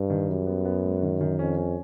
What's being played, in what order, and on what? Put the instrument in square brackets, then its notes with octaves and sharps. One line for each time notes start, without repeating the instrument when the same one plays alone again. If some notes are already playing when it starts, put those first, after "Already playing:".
Already playing: [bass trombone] G2
[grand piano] D#3
[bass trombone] F#2 [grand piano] G3
[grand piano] B3
B3
G#3
D#3
D#3
[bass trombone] F2 [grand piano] C#4
[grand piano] C#4